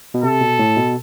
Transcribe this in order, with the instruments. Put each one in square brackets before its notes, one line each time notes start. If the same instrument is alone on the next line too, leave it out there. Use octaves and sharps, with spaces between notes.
[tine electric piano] B2
[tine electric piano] C3 [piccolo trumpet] A4
[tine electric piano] B2
A2
B2